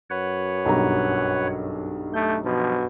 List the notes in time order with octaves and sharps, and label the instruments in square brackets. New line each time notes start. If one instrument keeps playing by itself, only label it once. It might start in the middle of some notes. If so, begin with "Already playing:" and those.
[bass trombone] F#2 [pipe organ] B4 C#5 F#5
[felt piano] B1 G2 A#5
[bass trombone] A3 [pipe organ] G6
[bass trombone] B2 [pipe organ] F3